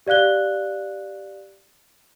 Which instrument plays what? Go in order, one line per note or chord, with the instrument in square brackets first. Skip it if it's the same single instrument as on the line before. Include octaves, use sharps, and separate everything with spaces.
[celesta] G4 D5 F5 F#6 G7